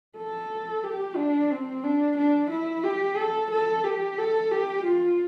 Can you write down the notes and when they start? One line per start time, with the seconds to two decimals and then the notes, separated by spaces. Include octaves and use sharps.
0.17 A4
0.84 G4
1.16 D4
1.50 C4
1.84 D4
2.17 D4
2.50 E4
2.84 G4
3.17 A4
3.51 A4
3.84 G4
4.18 A4
4.51 G4
4.85 F4